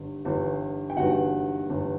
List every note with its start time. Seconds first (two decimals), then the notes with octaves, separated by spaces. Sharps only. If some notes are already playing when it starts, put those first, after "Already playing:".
Already playing: G1 G2
0.25 G1 G2 E3
0.90 G5
0.97 G1 G2 E3 F#4 F#5
1.70 G1 G2 E3